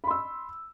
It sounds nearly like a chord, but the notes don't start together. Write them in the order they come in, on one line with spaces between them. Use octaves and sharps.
B5 C6 E6